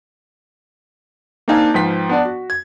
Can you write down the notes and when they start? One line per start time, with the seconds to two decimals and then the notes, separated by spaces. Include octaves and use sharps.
1.48 A#3 C4 D4 D#4 F5 G#5
1.74 G#2 F3 B4 G5 B6
2.09 B3 D4 D5
2.25 F#4
2.50 G#6